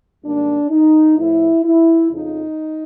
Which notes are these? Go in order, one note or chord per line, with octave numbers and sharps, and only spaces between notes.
G#2 D#3 G3 A#3 D4
D#4
A2 F3 A3 E4
E4
F2 C#3 F3 D#4